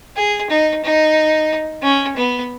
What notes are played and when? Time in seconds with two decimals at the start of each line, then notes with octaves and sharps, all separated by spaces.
0.16 G#4
0.50 D#4
0.84 D#4
1.82 C#4
2.16 B3